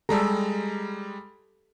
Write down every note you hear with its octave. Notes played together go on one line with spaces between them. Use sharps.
G3 G#3 G4 A4 A#5